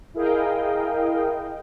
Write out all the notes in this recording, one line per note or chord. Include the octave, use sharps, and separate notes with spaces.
E4 G#4 A#4 D#5 F5 G5